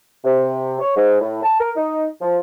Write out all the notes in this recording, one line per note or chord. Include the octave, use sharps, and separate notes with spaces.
C3
C#5
G#2
A2
A5
A#4
D#4
F3